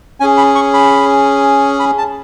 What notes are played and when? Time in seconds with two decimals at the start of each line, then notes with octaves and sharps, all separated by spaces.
0.20 C#4 G#4 G#5
0.38 B5
0.55 C#6
0.73 B5
1.80 B5
1.98 A5